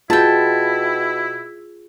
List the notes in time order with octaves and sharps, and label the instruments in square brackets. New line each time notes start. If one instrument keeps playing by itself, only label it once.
[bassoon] B2 [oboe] E4 [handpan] F4 G#4 [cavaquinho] G5 A5